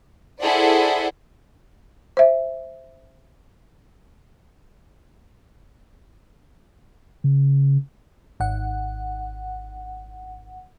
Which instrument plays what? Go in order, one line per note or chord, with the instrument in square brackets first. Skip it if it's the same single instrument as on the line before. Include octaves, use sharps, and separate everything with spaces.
[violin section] E4 G#4 A4 C5 D5 F#5
[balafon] C5 E5
[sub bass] C#3
[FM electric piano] G#1 F#5